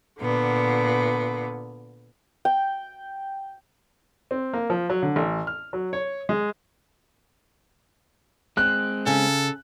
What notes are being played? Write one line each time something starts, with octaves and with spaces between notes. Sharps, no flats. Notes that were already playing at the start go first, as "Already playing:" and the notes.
A#2 D3 B3
G5
C4
A#3
F3
F#3
D3
A1
F6
F#3
C#5
G#3
G#3 C4 F#6
C#3 A4 G#5